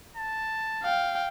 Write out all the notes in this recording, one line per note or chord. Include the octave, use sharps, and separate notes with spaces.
A5
F5 G5